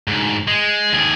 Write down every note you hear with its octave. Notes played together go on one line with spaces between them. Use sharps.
D2 G#2
G#3
D#2 G#4